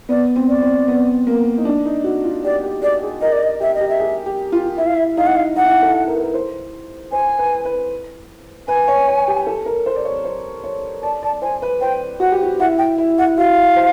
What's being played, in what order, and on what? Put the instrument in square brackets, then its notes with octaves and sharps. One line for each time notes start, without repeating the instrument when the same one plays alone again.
[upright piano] B3 [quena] D5
[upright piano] C4
[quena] D5
[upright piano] C4
B3
A#3
D#4
D4
D#4
F#4
F4
[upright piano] G4 [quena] D5
[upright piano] G4
[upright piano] G#4 [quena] D5
[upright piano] G#4
[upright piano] A#4 [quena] D#5
[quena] D5
D#5
[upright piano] G4 [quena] E5
[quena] D#5
[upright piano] G4
[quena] E5
[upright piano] G#4
G4
F4
[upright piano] E4 [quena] E5
[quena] F5
E5
[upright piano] D#4 [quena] F5
[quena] F#5
F5
[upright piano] D#4 [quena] F#5
[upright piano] E4
D#4
A4
A#4
B4
A#4
C5
[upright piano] C5 [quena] G#5
[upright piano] B4
B4
[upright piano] B4 [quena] G#5
[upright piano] C#5
C#5
G4
A4
A#4
C5
D5
C#5
C5
C#5
[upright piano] D5 [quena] A5
[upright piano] D5 [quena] A5
[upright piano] C5 [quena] G#5
[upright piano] B4
[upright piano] C5 [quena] G5
[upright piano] F#4 [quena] F#5
[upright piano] G4
F#4
[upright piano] E4 [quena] F#5
[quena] G5
[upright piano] E4
[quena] F#5
[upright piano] F#4 [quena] F5
[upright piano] C5